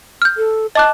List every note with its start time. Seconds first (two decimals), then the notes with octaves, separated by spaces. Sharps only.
0.22 F6 G6
0.37 A4
0.75 D#5 A5 D6 F#6